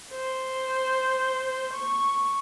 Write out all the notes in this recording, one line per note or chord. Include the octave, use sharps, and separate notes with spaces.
C5
C#6